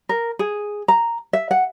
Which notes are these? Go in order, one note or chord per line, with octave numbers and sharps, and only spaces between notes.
A#4
G#4
A#5
E5
F#5